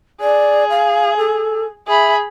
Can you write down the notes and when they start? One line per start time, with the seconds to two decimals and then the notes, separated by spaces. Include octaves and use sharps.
0.21 G#4 D5
0.70 F5
1.17 A4
1.87 G#4 E5 B5